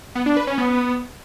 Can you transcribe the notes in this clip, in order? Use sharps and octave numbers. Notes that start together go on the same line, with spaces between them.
B3
D4
B4
C#4
B3